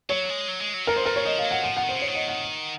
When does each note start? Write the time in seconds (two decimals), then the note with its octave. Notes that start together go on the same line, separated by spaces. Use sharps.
0.09 F#3 C#5
0.29 G#3
0.48 F#3
0.61 G#3
0.74 F#3
0.87 G#2 A#4
0.96 C5
1.05 A#2 A#4
1.16 C#5
1.25 F3 D#5
1.38 F5
1.44 F#3
1.51 F#5
1.64 F3 F#5
1.77 F#5
1.83 D#3
1.89 C5
1.95 C#3
2.02 C#5
2.07 D#3
2.14 D#5
2.28 F#5